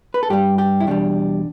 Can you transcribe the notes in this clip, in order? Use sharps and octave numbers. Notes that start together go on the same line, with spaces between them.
B4
A4
G2 G3 G4
G4
E4
E2 B2 G3 D4